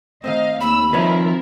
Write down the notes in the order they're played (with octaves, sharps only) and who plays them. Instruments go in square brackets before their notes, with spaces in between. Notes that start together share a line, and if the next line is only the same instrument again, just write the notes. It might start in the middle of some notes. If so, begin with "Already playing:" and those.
[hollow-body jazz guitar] D#3 A3 C4 [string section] D#5 F5
[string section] D#2 E6 [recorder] B5
[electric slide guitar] D#3 F3 [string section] C4 E4 A#4 [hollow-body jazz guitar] B4 C#5 D#5